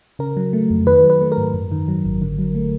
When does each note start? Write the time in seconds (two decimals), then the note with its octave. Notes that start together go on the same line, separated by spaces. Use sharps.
0.19 C#3 A#4
0.37 F#3
0.53 A3
0.70 F2
0.86 D#3 B4
1.04 F#3
1.10 B4
1.21 A3
1.32 A#4
1.38 G#2
1.54 F#2
1.71 D#3
1.88 F#3
2.05 G#1
2.22 D3
2.38 F#3
2.55 A3